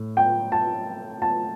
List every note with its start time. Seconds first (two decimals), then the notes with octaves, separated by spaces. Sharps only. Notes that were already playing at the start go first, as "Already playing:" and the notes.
Already playing: A2
0.17 G5
0.52 A5
1.22 A5